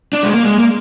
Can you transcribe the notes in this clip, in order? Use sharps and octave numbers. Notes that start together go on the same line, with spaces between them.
D4
G#3
A#3
G#3
A#3